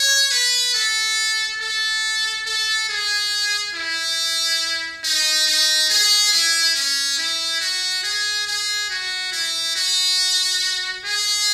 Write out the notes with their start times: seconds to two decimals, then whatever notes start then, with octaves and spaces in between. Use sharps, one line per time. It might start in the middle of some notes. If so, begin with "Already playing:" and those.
Already playing: C#5
0.31 B4
0.74 A4
1.60 A4
2.46 A4
2.89 G#4
3.74 E4
5.04 D#4
5.47 D#4
5.90 G#4
6.33 E4
6.75 C#4
7.18 E4
7.61 F#4
8.04 G#4
8.47 G#4
8.90 F#4
9.32 E4
9.76 F#4
11.05 G#4